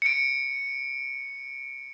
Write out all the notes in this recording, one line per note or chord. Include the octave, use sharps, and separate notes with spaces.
C#7 D7